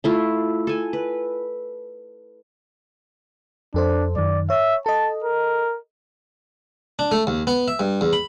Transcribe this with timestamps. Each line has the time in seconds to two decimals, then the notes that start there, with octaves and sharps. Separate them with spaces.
0.04 A3 E4 F4
0.67 A4 G#5
0.93 B4
3.74 F2 D4 A4 C5
4.16 F#2 D#3 D5
4.50 C#5 E5
4.86 A4 D#5 A5
5.24 A#4
6.99 D4
7.11 A3
7.27 D#2
7.47 B3
7.68 E5
7.79 G2
8.01 E2
8.13 B5